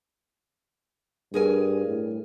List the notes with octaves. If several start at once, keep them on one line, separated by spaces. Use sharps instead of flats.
G2 G#4 A#4 G#5
A2